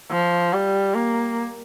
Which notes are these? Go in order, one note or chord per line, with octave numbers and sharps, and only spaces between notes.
F3
G3
A#3